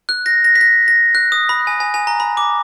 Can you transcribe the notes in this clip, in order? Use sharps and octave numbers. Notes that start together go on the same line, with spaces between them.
F#6
A#6
A#6
B6
A#6
A#6
F#6
D#6
B5
G#5
G#5
G#5
A#5
B5
D6